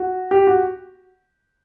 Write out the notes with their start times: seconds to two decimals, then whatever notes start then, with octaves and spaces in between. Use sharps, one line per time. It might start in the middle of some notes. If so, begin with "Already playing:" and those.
Already playing: F#4
0.31 G4
0.47 F#4